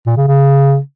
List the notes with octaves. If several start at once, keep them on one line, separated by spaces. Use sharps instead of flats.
A#2
C#3
C#3